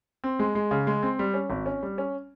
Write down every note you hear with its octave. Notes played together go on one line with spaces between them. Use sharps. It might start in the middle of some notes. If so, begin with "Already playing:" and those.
C4
G#3
G#3
C#3
G#3
C4
G3
C#4
G#1
C#4
G3
C#4